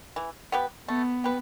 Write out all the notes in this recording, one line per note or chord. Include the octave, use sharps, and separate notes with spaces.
E3
B3 G4 B4
A3 B3
G4 B4